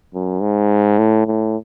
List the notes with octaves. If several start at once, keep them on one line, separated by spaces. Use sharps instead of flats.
F#2
G#2
A2
A2